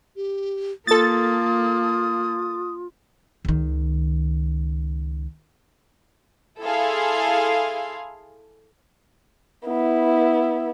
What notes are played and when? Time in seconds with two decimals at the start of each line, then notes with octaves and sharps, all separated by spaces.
0.16 G4
0.87 A#3 F4 A4 D#6 A6
3.45 C#2 D#3
6.62 E4 G#4 A4 F5 C6
9.66 B3 E4